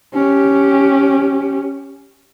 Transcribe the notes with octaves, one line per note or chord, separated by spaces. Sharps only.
C#4 G4